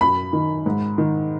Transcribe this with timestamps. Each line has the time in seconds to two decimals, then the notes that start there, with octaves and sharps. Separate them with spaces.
0.01 F#2 B5
0.33 D#3
0.66 G#2
0.98 D#3